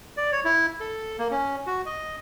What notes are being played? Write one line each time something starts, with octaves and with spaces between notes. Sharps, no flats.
D5
C#5
E4
A4
A#3
C#4
F#4
D#5